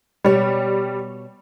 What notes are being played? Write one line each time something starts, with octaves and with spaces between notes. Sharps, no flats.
B2 G3 C#5